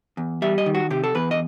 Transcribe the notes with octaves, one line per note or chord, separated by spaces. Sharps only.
E2
G3 E5
D#5
D#3
F#4
C3 G4
A4
E2 B4
D#5